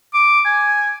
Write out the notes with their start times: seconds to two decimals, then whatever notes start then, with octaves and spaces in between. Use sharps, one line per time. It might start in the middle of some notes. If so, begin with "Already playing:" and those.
0.14 D6
0.45 G#5